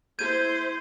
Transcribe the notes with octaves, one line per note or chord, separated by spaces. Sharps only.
E4 C5 G6 G#6 D#7